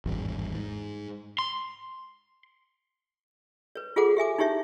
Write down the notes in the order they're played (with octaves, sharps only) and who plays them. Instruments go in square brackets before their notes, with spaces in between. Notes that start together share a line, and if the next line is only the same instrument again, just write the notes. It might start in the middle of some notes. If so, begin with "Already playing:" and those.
[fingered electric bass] G#1 E2 G2
G#2
[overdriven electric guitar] C6
[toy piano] B4 C#5
F4 G#4 A4 C5 F#5 D6
G4 E5 G#5 D6
D#4 E4 G4 C#5 E5